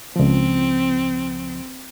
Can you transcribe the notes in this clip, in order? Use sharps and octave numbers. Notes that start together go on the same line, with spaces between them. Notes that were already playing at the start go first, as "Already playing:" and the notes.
C#2 F3 C4